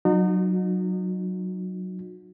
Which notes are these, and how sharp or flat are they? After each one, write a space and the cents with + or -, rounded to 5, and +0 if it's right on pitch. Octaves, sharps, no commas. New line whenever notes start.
F#3 +0 D#4 -30 F#4 -35